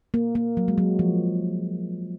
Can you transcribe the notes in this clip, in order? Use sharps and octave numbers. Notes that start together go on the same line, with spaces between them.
A#3
A#3
F#3
G#3
F#3
F3